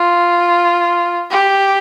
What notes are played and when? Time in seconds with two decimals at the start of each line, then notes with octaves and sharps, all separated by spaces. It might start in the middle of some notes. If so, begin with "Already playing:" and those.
Already playing: F4
1.30 G4